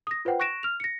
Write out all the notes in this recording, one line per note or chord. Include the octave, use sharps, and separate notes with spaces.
D#6 A#6
F4 B4 C5 F#5 G5
C#6 F#6 A#6 D7 E7
F6 F7
A#6 C#7